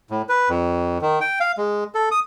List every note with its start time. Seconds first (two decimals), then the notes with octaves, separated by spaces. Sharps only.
0.10 A2
0.29 B4
0.49 F2
1.02 D#3
1.20 G5
1.40 F5
1.58 G#3
1.95 A4
2.11 D#6